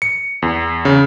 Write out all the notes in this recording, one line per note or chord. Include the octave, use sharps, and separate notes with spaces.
C#7
E2
C#3